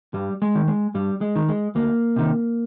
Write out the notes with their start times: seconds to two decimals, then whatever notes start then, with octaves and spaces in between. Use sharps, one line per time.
0.14 G2 G3
0.42 G#3
0.55 D#3
0.68 G#3
0.94 G2 G3
1.21 G#3
1.36 D#3
1.49 G#3
1.75 D2 A#3
2.16 C3 D#3